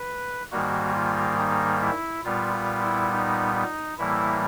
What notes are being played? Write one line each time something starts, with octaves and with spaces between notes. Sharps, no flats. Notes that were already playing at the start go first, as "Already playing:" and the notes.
Already playing: B4
G#2 D#3 G3 A#3 F#4
F4
D#4
E4
A#2 G3 B3 F4
F4
E4
D#4
D#4
A2 E3 G3 A#3 E4